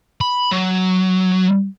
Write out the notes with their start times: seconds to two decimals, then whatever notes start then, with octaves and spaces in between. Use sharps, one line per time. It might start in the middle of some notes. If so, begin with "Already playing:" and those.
0.21 B5
0.52 F#3